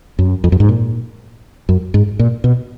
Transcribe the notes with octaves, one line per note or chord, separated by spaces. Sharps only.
F#2
F2
F#2
G#2
A#2
F#2
G#2
A#2
B2